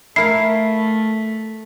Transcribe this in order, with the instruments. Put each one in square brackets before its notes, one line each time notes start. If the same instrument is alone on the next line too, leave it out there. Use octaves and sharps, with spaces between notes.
[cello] A3 [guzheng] E4 A#4 F5 [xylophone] C7